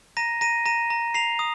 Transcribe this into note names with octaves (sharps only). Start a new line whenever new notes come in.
A#5 A#6 D#7
A#5 A#6 D#7
A#5 A#6 D#7
A#5
A#5 C7 F7
D#6